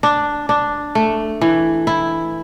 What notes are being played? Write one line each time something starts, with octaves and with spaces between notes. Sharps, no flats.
D4
D4
A3
E3
E4